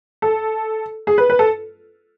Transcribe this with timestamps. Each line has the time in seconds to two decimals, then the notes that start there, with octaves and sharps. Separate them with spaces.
0.22 A4
1.07 G#4
1.18 B4
1.30 B4
1.39 A4